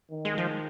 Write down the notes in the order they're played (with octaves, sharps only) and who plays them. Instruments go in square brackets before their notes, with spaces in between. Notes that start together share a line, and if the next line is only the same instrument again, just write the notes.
[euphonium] D#3
[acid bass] G#3
F3